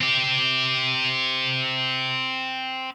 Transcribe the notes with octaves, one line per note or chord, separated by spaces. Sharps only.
C4 G4